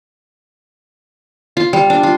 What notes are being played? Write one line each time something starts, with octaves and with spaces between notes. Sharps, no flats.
F4
G3
D4
F4